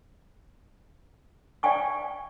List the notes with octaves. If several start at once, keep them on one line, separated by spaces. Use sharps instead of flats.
D5 F5 G5 G#5 C#6